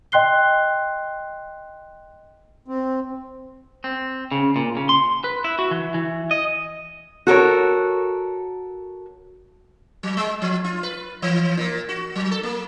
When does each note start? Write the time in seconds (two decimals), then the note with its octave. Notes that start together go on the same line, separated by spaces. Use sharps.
0.12 D#5 G5 C6 F#6 C7 G7
2.68 C4
3.84 C4
4.32 C#3
4.56 A#2
4.77 C#3
4.89 C6
5.24 B4
5.44 E4
5.59 F#4
5.71 E3
5.94 E3
6.31 D#5
7.27 F#4 A4 A#4 C#5
10.03 F#3
10.17 G#3
10.42 F3
10.65 F4
10.83 B4
11.22 E3
11.57 A#2
11.89 F#4
12.15 F#3
12.31 A4
12.43 A#3